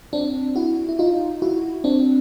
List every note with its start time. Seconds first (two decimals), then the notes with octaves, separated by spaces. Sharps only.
0.13 C4 D4
0.56 E4 F#4
0.89 E4
0.99 D#4 F4
1.42 E4 F#4
1.84 C4 D4